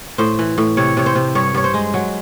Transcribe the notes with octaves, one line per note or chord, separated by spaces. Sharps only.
A2 C5
E3
A2
C3 C#5
C3 C#5
C5
C3
G2 C#5
G2 C#5
C5
G#3
F#3